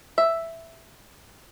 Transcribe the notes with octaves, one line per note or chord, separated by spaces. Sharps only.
E5